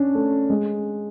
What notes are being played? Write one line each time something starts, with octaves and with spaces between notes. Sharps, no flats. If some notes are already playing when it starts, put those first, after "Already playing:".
Already playing: C#4 D4
A3
G#3